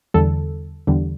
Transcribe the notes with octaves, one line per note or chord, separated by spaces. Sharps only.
E2 D3 G3 A4
E2 D3 G3